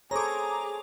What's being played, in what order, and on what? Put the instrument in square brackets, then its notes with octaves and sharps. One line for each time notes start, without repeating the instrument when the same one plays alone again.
[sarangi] G#4 [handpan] A4 C5 C#5 [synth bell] A#5 D6